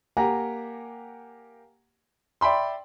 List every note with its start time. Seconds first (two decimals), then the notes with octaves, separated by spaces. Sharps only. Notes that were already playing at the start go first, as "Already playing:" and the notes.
0.17 A#3 G4 F#5 G#5 A#5
2.41 D5 E5 G5 B5 C6